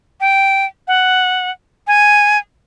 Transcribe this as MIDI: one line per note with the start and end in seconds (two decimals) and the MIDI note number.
0.21 0.65 79
0.88 1.50 78
1.87 2.38 80